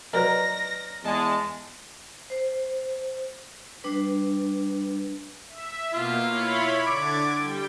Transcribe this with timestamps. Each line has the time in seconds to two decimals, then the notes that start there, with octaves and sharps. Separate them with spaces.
0.13 F#3 A#4 B4 D5 D#5 A#6
1.04 E2 G#3 A5
2.30 C5
3.84 G3 D4 B4
5.49 E5
5.93 B2 A#3 F4
6.27 E4 C#5 B5
6.87 D3 D6 G#6 A6
7.37 G3 G5